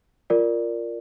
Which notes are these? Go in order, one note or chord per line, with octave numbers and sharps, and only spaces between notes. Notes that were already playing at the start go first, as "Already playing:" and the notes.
F4 A#4 D5